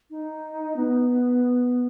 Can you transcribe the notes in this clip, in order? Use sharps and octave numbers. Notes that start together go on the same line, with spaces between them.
D#4
B3